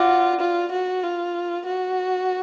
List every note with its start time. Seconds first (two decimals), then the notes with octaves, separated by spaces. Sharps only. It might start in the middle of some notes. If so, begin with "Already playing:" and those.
Already playing: F4 F#4 D5 F#5 D6
0.40 F4
0.72 F#4
1.03 F4
1.66 F#4